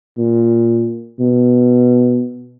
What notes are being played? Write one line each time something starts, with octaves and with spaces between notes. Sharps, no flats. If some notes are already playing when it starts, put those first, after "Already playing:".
A#2
B2